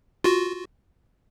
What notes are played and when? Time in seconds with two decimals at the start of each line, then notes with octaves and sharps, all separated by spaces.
0.24 F4 F#4